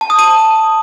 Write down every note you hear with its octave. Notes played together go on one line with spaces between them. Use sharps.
A5
D#6
D#7